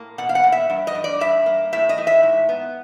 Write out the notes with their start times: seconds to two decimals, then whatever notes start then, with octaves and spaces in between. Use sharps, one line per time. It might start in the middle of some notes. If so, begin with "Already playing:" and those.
Already playing: A2 A#3
0.18 B2 F#5
0.29 F5
0.35 F#5
0.44 B2
0.52 E5
0.70 G2
0.87 D#5
0.95 G2
1.04 D5
1.20 G2 E5
1.46 A#3
1.73 A2 E5
1.89 D#5
1.98 A2
2.07 E5
2.23 G#2
2.49 B3